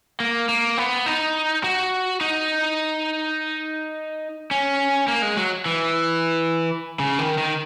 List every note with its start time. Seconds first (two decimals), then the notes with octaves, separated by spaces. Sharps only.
0.20 A#3
0.49 A#3
0.77 B3
1.06 D#4
1.64 F#4
2.21 D#4
4.51 C#4
5.08 A#3
5.22 G#3
5.37 F#3
5.66 E3
6.99 C#3
7.19 D#3
7.38 D#3